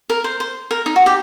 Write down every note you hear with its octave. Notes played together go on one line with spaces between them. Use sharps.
A#4
C5
C5
A#4
D#4
F#4
G4